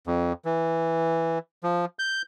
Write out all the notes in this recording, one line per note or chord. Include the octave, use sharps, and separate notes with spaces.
F2
E3
F3
G6